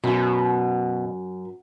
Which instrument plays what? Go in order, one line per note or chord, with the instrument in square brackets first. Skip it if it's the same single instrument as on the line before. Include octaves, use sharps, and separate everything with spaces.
[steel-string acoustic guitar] F#2 [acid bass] B2